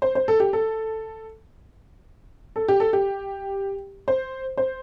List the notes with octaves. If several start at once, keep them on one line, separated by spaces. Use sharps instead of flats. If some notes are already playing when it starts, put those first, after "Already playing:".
C5
C5
A4
G4
A4
A4
G4
A4
G4
C5
C5